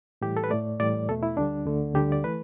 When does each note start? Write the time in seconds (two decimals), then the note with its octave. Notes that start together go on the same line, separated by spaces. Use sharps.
0.22 A2 E3 G3 G4
0.37 A4
0.44 B4
0.50 A2 A3 D5
0.80 A2 E3 G3 D5
1.08 E2 B2 A3 A4
1.23 E4
1.37 D2 D3 G3 D4
1.65 D2 D3 A3
1.94 D2 D3 G3 G4
2.12 D5
2.24 E3 A3 B4